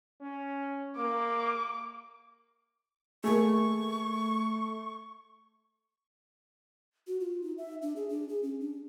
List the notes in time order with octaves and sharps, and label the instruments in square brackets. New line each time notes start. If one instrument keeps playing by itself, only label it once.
[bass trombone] C#4
[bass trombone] A#3 [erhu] D6
[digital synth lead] A3 [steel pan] A#3 G#4 [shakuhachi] C#6
[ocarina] F#4
F4
D#4
E5
D4
G#4
D4
G#4
C#4
D4